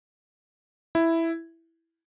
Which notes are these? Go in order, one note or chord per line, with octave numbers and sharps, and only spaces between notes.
E4